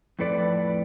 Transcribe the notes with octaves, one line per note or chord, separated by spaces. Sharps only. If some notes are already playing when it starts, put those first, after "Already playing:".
F2 A2 A4 B4 D5